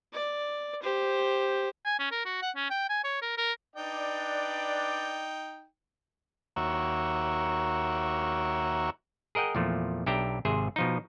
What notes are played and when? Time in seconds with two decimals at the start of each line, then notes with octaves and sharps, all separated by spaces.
0.13 D5
0.82 G4 C5
1.85 G#5
1.99 C#4
2.11 A#4
2.25 F#4
2.42 F#5
2.56 C#4
2.70 G5
2.89 G#5
3.04 C#5
3.22 A#4
3.38 A#4
3.76 D4 D#4 B4 D5 G5
6.56 D#2 A#3 F#4 C#5 E5
9.35 G#4 A#4 D#5 F#5 G5
9.55 E2 A#2 F3 A3
10.06 B1 D4 G4 E5 G5 A#5
10.45 G#1 C3 G#4 C5 E5
10.76 B2 F3 D#4